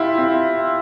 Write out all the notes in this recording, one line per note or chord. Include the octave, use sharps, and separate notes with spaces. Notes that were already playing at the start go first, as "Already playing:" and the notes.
Already playing: E4 F4 G4
C4